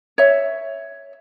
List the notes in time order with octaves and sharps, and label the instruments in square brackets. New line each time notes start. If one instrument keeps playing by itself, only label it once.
[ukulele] C#5 E5